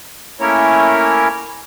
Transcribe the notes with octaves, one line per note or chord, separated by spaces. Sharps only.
A3 A#3 C#4 E4 A#4 C#5